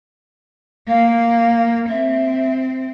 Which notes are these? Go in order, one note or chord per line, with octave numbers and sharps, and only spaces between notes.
A#3 F5
C4 E5